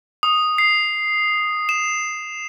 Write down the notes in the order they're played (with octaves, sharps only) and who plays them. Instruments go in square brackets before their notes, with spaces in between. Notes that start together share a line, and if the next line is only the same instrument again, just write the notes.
[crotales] D#6
C7
E7